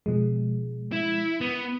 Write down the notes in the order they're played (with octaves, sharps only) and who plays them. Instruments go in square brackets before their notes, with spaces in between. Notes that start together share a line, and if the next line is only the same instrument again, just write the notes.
[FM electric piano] B2 F3 G#3
[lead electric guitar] E4
B3